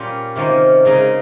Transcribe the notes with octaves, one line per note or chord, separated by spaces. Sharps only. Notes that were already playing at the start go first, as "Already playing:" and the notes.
Already playing: A#2 G3 C#4 F4
C3 D#3 A#3 C#4 F4
C#3 G#3 D#4